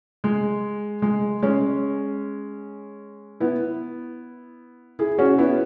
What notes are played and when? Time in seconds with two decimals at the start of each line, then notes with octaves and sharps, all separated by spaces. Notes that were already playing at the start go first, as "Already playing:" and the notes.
0.24 G#3
1.02 G#3
1.42 G#3 C#4
3.40 B3 E4
4.99 E4 G#4
5.18 C#4 F#4
5.38 B3 E4